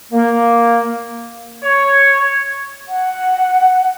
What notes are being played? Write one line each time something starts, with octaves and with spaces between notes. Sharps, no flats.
A#3
C#5
F#5